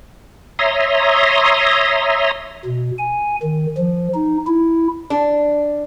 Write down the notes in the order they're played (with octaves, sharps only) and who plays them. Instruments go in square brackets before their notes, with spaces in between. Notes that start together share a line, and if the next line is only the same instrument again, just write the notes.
[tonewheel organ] C#5 E5 A#5 C6 D#6
[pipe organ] B2
G#5
D#3
F3
D#4
E4
[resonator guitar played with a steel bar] D4